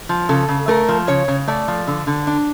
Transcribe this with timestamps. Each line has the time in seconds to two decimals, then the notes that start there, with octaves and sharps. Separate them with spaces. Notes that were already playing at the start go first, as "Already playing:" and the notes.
0.09 F3
0.29 C#3 A4
0.48 C#3
0.68 A3 A#4
0.88 F3
1.07 C#3 C#5
1.28 C#3
1.48 A3 D5
1.68 F3
1.87 D3
2.07 D3
2.27 D4